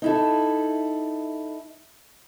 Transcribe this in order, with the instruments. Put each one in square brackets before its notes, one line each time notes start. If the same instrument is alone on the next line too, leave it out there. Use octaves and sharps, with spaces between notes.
[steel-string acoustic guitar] D#4 E4 A4